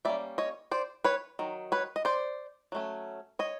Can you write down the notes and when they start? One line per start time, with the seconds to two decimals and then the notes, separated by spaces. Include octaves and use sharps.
0.05 G3 A#3 C#4 D5 E5
0.38 C#5 D#5
0.71 C5 D5
1.04 B4 C#5
1.39 D#3 F#3
1.72 B4 C#5
1.96 D#5
2.05 C5 D5
2.72 F#3 A3 C#4
3.39 C#5 D#5